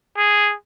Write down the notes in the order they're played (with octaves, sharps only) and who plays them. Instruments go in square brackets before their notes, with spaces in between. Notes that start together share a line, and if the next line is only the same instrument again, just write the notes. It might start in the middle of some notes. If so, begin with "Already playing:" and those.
[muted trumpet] G#4